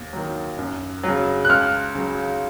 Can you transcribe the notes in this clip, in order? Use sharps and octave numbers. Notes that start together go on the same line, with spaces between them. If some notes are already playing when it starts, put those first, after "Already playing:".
Already playing: D#2
D#3 F#3
F#2
C#3 F#3
F#6
C#2 F6
C#3 F#3